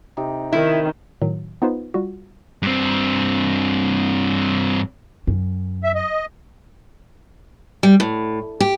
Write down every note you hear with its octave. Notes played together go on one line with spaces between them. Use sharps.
C3 D#4 G4
D#3 E4
A2 D#3 F#3
B3 D#4 F4 B4 C5
G3 F4 F#4
G2 C4
F#2
E5
D#5
G3
A2
G4